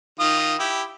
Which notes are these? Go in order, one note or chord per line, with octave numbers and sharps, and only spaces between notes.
D#3 F4 D#6
E4 G4